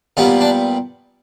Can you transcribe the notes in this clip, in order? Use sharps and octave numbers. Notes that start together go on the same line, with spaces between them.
A#2 G3 B3 C#4
D4